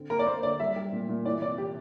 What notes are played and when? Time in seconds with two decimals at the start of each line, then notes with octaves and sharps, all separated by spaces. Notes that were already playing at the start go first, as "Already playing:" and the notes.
Already playing: D3 C4
0.10 A#3 A#4
0.19 D5
0.26 A#3 C5
0.43 D3 D5
0.59 G3 E5
0.76 G3
0.92 A#2
1.09 A#2
1.25 E3 D5
1.42 C3 D5
1.58 C3 G4